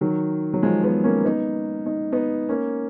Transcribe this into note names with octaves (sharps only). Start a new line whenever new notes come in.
D#3 F#3
F#3
F3 G#3
G#3 B3
A#3 C#4
B3 D#4
D#4
B3 D#4
A#3 C#4